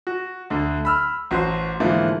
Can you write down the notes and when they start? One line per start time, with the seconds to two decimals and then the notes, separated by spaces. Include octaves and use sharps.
0.07 F#4
0.50 D2 D3
0.85 B5 E6 F6
1.31 A1 F#4 C5 C6
1.80 G#2 D3 E3 F3 A3 A#3